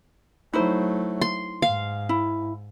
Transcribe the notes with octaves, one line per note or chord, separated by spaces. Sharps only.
F#3 A3 D#4 E4 C5
C6
G#2 F5
E4